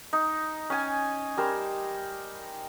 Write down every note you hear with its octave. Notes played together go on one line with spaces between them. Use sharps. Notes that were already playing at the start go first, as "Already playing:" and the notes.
D#4
C#4 G#5
G3 A#4 C5